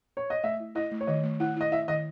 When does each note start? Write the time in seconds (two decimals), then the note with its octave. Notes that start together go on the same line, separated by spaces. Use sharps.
0.17 C#5
0.30 D#5
0.43 A3 E5
0.60 E4
0.75 E4 D#5
0.91 A3
1.01 C#5
1.07 D#3 D#5
1.23 A3
1.40 E4 F#5
1.56 E4 D#5
1.72 E4 E5
1.88 D#3 D#5